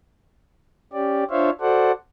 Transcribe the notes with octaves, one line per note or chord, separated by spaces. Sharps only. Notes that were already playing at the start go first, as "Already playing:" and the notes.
C#4 G4 D5
D4 F4 C5 C#5 E5 F5
F#4 A4 C5 D5 F#5